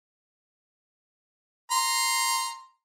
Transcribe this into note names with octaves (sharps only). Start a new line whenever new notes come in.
A#5 C6